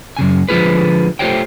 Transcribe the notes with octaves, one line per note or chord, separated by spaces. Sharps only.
F#2 C#3 G#5
D3 F3 G#3 F4 G#4 B4
A3 F4 G4 C5 C#5 G5